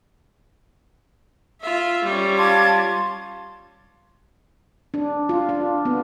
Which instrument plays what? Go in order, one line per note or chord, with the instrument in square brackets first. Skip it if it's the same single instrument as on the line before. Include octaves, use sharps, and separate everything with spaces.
[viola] F4 E5
G3 C#4
[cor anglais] F4 [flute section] A5 D6 G#6
[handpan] D4
F4
D4
B3